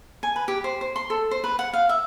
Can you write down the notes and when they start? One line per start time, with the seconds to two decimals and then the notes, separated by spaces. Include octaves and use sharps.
0.23 G#5
0.36 B4
0.48 G4
0.64 C5
0.81 C5
0.96 C6
1.10 A4
1.31 C5
1.44 B4
1.59 F#5
1.73 F5
1.89 E5